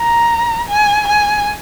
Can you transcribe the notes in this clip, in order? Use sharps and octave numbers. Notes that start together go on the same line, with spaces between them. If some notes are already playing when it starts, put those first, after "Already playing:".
Already playing: A#5
G#5
G#5